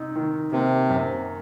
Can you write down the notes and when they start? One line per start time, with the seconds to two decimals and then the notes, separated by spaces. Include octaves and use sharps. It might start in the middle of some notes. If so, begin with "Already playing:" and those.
Already playing: C3 D#4
0.16 D#3
0.52 C3 A#3
0.89 F#2